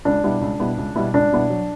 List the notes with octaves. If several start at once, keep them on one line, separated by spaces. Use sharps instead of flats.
C#2 D4
B2 G3 B3 E4
C#2
B2 G3 B3 E4
C#2
B2 G3 B3 E4
C#2 D4
B2 G3 B3 E4
F#3